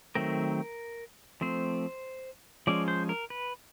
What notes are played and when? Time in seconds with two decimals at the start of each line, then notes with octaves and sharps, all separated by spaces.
0.15 D#3 F#3 A3 C4 A#4
1.41 F3 A3 C4 C5
2.67 F3 G#3 C#4 D5
2.88 C5
3.09 A#4
3.30 B4